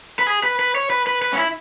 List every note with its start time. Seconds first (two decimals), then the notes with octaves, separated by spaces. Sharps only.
0.19 B4
0.27 G#4
0.43 B4
0.59 B4
0.75 C#5
0.90 B4
1.07 B4
1.22 B4
1.33 C#4
1.37 E4